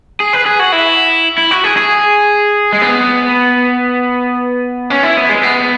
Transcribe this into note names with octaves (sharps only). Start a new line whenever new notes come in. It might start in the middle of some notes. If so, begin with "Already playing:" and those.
G#4
B4
G#4
F#4
E4
E4
F#4
G#4
G#4
G#3
B3
C#4
E4
B3
G#3
B3